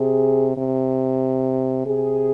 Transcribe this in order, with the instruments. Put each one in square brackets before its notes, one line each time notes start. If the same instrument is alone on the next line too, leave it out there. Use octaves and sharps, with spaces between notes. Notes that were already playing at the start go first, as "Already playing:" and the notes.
Already playing: [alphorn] C3 [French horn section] G#4
[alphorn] C3
[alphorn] C3 [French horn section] G#4